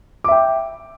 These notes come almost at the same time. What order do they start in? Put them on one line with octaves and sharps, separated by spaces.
D6 E5 G5